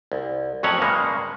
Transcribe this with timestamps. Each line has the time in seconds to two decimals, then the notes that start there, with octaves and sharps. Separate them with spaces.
0.12 C2
0.63 F2 A2 F#3 C#4 C#5 F#5
0.82 G2 C#3 G#3 A#3